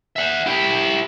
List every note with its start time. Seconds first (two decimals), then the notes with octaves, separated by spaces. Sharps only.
0.16 E5 F#5
0.46 E4 G4